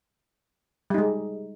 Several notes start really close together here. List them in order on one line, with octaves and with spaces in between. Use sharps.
G3 D#4 G#3